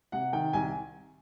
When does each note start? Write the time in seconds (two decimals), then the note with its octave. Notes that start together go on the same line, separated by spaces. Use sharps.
0.12 C3 F#5
0.33 D#3 G5
0.53 C2 G#5